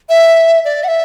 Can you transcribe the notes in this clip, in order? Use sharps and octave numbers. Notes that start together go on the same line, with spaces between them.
E5
D5
F#5
E5